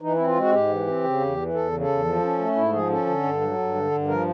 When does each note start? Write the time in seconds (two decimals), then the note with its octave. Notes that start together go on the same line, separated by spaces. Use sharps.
0.02 E3 D#4
0.14 C4 E4
0.27 F4
0.35 G#3 F#4
0.52 G#2 G4
0.69 E3
0.86 C4
1.03 C#3
1.20 E2
1.37 E3
1.53 E2 A4
1.71 C#3
1.80 A4
1.88 E2
2.04 F3
2.21 C#4
2.38 A3
2.56 G#2 E4
2.73 F3 G#4
2.89 C#4 A4
3.06 D3
3.23 G2
3.41 F#3
3.58 G2
3.74 D3
3.91 G2
4.08 F3 A#4